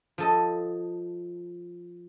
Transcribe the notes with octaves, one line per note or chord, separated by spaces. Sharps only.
F3 A4 D#5